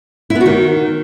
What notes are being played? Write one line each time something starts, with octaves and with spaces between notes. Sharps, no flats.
E4
B3
F#4
D#3